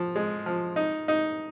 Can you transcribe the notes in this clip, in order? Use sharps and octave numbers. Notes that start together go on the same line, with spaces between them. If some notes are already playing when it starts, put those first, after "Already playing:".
Already playing: F3
G#3
F3
D#4
D#4